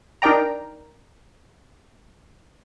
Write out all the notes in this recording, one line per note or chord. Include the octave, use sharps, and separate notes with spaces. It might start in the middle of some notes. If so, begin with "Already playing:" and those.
D4 D#4 A#4 D5 G5 A#5